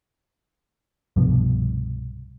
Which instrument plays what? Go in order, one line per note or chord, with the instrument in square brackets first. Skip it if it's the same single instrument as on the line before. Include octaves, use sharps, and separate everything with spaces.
[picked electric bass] C2 G2 B2 F3